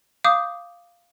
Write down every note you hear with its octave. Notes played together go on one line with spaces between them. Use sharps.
F5 D6 D#6 G6